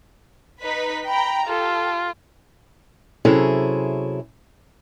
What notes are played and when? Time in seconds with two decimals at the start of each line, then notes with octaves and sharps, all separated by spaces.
0.62 D#4 B4 B6
1.09 G5 A#5 B5
1.47 F4 G4 A4
3.25 C3 F#3 C#4 E4 G#4 A4